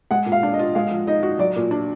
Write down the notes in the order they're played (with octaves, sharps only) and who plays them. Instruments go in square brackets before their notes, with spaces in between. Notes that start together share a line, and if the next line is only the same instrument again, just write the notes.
[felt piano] G#3 [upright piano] F#5
[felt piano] A#2
[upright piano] F5
[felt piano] D4
[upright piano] D#5
[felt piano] F4
[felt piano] G#3 [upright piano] F5
[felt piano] F3
[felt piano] D#4 [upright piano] D#5
[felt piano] F#4
[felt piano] F#3 [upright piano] D5
[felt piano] A#2
D4